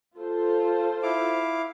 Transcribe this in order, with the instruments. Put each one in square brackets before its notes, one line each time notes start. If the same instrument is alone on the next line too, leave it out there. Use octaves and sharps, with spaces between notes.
[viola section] F4 A4 C5
[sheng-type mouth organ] E4 F5 D6